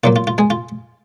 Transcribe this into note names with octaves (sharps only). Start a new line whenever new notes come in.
A#2 F#3 A#3 F4
F4
F4
G#3 G#4
F4